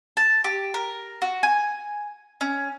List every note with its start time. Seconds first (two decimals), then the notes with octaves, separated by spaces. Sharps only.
0.17 A5
0.44 G4
0.74 A#4
1.22 F#4
1.43 G#5
2.41 C#4